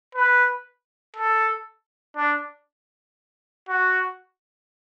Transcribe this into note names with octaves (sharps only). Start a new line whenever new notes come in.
B4
A4
D4
F#4